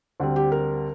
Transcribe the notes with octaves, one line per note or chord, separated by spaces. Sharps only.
D2 D3 G3 C4
G4
A#4